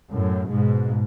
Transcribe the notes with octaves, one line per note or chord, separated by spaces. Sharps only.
F#2 A2
G#2 B2